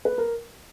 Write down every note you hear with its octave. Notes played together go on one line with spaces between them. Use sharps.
B4
A#4